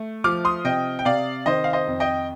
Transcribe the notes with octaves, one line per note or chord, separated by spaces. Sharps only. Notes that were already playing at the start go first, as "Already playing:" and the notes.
Already playing: A3
F3 D6 F6
C6 D#6
C3 D#5 G5
G5
C3 D5 F5
D#3 C5 D#5
F5
C5 D#5
F2
D#5 G5